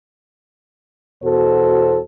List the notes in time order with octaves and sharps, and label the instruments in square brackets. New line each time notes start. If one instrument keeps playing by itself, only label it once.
[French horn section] E2 B2 F#4 A4 C5